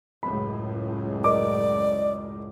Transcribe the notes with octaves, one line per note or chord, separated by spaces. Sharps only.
C#2 F#2 A2 B5
A#4 D5 D#5 D6